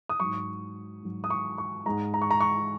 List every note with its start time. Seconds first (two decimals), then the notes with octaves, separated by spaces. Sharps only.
0.09 D#6
0.20 G#2 F#3 C#6
1.03 G#2 F#3
1.24 D#6
1.30 C#6
1.58 C#6
1.86 G#2 G#3 A#5
2.14 A#5
2.22 C#6
2.31 A#5
2.40 C#6